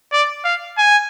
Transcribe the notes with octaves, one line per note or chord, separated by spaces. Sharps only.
D5
F5
G#5